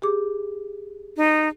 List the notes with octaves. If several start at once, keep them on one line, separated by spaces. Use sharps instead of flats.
G4 G#4 D6
D#4